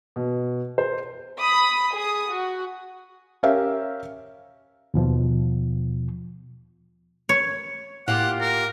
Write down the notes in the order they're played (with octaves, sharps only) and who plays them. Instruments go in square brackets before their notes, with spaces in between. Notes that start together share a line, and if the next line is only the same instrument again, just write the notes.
[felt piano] B2
C5
[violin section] B5 D#6
G#4 D#6
F#4
[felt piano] C#4 G4 A#4 E5 F5
[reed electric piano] D#2 B2 F3
[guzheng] C#5
[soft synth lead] A2 [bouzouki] A#3 F4 G4 [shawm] F#5
[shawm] A#4